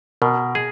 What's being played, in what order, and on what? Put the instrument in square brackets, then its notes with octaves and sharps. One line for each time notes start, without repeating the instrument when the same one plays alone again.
[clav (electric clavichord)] B2 [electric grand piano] A#4
[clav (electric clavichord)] G#4